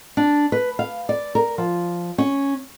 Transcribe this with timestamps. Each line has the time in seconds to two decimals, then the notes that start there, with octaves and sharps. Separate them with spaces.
0.17 D4
0.52 B4
0.79 F5
1.09 D5
1.35 A#4
1.58 F3
2.18 C#4